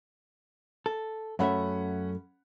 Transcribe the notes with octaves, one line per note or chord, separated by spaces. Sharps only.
A4
F#2 A3 C#4 E5 F#5 B5